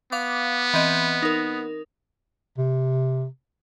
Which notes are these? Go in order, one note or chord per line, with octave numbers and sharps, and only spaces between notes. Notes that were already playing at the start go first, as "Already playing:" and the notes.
B3 F5 D6
E3 C4 D#5
D#4 A#4
C3